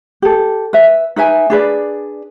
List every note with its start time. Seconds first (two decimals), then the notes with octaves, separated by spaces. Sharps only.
0.22 G4 A4
0.73 B4 E5
1.16 D#4 B4 E5 G#5
1.50 D4 G#4 B4 D5